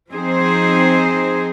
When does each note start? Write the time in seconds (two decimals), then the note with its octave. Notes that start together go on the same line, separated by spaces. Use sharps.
0.11 F3 C4 D#4 G#4 C5